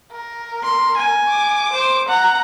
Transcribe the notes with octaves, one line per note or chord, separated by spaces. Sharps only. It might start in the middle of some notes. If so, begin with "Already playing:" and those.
A#4
C6
G#5
D6
C5
F#5 A#5